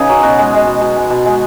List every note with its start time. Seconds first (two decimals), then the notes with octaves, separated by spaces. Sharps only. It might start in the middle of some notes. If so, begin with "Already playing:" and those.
Already playing: C#3 D#4 G#4 B4
0.09 F#3
0.23 B2 F#4
0.38 G#3
0.53 G#3
0.67 B2
0.81 B2
0.96 G#3
1.10 B2
1.26 G#3